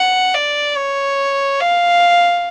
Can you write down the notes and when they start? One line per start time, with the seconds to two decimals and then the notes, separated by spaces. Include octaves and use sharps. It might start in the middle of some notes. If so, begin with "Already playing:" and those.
Already playing: F#5
0.34 D5
0.76 C#5
1.60 F5